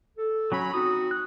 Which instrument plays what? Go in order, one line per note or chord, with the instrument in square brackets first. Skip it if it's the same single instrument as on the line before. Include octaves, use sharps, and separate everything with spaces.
[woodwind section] A4
[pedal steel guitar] F#3 C#4 [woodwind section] C#5 A#5 B5
[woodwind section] C4 D#4 F#4 [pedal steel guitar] D#6
[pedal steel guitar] F#6